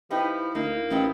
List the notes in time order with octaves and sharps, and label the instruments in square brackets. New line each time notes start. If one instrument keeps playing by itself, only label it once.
[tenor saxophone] F3 [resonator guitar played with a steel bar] D#4 G4 B4 [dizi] E4
[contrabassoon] D2 [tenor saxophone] A#3 [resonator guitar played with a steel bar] D#4
[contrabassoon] A1 [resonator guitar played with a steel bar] B3 C4 D#4